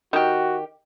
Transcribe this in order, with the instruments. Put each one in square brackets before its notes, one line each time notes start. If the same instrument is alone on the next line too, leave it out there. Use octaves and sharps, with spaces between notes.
[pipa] D#3 G4 [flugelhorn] F#4